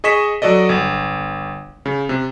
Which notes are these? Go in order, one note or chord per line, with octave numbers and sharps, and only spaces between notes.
G#4 D#5 C#6 B6 E7
F#3 F#4 A4 D5 D#5
G1
C#3
C3